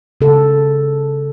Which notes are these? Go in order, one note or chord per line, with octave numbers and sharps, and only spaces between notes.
C#3 A4